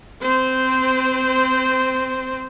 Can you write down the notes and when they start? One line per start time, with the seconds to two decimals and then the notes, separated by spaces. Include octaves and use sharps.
0.22 C4 C5